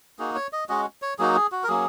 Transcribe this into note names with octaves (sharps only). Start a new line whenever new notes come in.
A#3 D#4 F#4 G#4
C#5
D#5
G#3 C#4 F#4 D#5
C#5
F#3 A#3 D#4 F#4 G#4
G#4
F#4
A#4
F#3 A#3 C#4 G#4